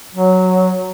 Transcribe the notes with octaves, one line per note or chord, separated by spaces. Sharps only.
F#3